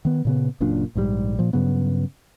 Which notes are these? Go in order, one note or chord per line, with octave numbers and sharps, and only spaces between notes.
D#3 B3
A#2 C#3 B3
F#1 F#2 A#2 D4
A#1 G#2 C3 G3
A#2 F3
G2 C#3 F#3 B3